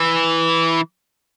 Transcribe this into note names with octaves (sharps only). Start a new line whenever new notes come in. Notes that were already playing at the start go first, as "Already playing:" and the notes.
Already playing: E3